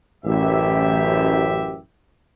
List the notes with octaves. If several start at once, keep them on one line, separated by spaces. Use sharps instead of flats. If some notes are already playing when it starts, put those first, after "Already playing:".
A1 F#2 G4 E5